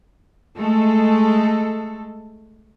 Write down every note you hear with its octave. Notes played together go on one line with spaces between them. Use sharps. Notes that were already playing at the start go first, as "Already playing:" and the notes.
G#3 A3 A4